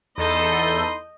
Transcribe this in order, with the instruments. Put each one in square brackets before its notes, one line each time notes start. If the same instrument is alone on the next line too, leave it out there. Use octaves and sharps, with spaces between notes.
[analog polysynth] E2 A4 G6 [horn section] D#4 B5 C6 [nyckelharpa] D#5